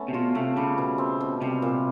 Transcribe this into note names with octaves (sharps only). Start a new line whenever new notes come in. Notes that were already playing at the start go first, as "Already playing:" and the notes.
Already playing: A3 B3 C#4
C3
B2 F4
C3 A3
C#3 G3
B2
C4
B2
C3 G3
A#2